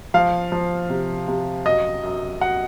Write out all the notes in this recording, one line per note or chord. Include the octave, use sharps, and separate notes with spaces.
F3 F5
F3
C3
C3
F#2 D#5
F#2
F#2 F#5